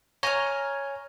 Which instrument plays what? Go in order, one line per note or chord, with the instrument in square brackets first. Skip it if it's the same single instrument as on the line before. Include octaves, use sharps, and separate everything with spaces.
[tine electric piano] C#5 G#5 [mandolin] A#5 F6